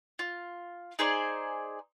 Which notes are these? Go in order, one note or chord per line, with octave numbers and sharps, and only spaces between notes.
F4
D#4 G#4 C5 D5